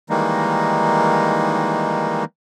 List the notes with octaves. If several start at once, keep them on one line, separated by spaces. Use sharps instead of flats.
D#3 E3 G3 G#3 A#3 D#4